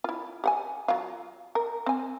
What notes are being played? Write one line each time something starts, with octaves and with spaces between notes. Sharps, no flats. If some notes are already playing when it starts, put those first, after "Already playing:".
E4 F4
G4 F#5 G#5
F#3 F4
A#4
C4 G#5